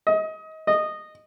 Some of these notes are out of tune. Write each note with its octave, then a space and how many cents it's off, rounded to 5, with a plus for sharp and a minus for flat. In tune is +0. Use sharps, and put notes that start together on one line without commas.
D#5 +25
D#5 -15